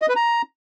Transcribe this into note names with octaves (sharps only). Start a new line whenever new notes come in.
D#5
B4
A#5